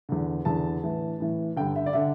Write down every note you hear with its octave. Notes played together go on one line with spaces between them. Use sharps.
E2 D3
E2 D3 A5
A2 E3
A2 E3
G2 D3 G5
E5
D5
D3 E5